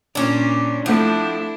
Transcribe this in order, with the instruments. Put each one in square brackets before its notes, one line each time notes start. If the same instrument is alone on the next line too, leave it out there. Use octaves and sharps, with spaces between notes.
[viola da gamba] A#2 [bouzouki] C#4 D4
[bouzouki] F3 [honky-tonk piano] A3 C4 F#5 [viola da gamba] D4 E4